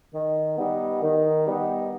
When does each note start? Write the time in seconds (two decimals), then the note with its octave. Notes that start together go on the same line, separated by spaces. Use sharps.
0.14 D#3
0.58 G3 B3 D#4
1.02 D#3
1.46 G3 B3 D#4